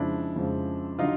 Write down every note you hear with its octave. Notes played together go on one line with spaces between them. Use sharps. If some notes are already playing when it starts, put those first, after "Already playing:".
Already playing: F2 C#3 F3 G#3 D4 E4
F2 C#3 F3 G#3
D3 F#3 D#4 F4